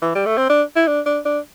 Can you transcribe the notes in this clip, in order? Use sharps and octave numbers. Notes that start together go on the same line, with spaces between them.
E3
G3
A3
C4
D4
E4
D4
D4
D4